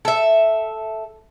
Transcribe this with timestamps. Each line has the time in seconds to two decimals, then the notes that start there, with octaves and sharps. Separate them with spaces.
0.05 A4 E5